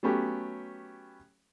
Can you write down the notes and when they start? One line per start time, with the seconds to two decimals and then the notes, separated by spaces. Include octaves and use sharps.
0.03 F#3 A3 B3 C#4 G4